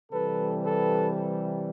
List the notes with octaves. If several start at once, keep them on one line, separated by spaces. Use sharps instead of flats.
C3 E3 G3 A4 B4
A4 B4